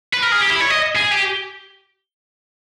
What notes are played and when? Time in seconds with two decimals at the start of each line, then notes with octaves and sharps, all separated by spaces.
0.13 B4
0.22 A#4
0.32 G#4
0.41 G4
0.50 E4
0.60 C#5
0.70 D#5
0.95 G#4
1.11 G4